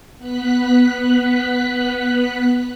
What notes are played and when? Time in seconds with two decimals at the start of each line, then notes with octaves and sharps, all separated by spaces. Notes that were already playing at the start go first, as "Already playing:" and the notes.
0.18 B3 F#6 B6